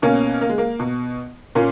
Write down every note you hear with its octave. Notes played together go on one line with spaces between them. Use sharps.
B2 A#3 C#4
A#3
G#3
A#3
B2
A#2 A#3 C#4